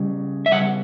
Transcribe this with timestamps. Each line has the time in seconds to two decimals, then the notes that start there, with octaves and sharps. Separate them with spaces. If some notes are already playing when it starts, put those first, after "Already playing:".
Already playing: C#3 G3
0.46 E5
0.51 C#3 G3 F#5